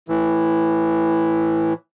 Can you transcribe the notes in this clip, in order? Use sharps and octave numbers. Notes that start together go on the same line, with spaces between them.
A2 E3